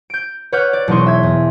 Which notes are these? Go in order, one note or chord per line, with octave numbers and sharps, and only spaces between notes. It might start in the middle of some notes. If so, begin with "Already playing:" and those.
G6 D7
B4 C#5 F#5 D6 F6 G6
D5
E1 F#3 A#3 D#4 C6 C#6
E5 C6 G#6
E2